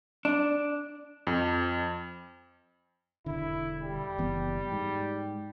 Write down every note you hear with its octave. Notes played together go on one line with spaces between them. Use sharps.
D4
F2
E1 D3 E4
G3
F#1 E3 B3
G#2